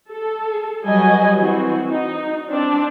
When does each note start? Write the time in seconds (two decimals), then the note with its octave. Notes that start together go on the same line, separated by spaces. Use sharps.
0.11 A4
0.84 F#3 G3 F#4 B4 D#5 G#5
1.39 E3 C4 F#4
1.88 D#4
2.50 C4 D4